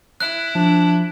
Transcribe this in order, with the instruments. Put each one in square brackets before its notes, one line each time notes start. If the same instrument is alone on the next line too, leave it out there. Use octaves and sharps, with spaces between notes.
[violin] E4 [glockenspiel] F#6
[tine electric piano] F3 [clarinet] D4